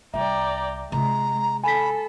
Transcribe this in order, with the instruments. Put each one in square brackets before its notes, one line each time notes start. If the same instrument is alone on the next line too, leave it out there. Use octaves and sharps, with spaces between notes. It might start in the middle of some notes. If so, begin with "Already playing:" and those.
[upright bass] C2 G3 [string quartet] D5 G5 A#5 [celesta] E5
[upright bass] C3 F4 [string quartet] G#3 [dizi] A#5
[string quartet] A4 [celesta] G#5 B6 [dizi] B5